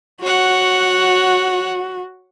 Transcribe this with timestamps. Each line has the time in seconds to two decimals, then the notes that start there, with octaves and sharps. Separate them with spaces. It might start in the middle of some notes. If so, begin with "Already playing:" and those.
0.22 F#4 C#5 F#5